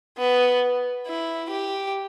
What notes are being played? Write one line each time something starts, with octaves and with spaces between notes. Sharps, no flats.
B3
E4
G4